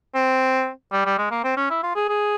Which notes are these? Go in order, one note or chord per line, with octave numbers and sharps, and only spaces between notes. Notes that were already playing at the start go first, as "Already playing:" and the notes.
C4
G3
G3
G#3
A#3
C4
C#4
E4
F4
G#4
G#4